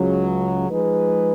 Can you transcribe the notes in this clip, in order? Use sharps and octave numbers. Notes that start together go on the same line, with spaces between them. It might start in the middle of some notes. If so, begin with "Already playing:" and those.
Already playing: C#2 C#3 F#3
F3 G#3 D#4 G#4 B4